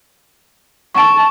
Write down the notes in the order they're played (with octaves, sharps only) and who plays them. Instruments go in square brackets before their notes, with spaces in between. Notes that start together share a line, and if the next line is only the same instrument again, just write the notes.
[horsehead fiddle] A5 [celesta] C#6 D7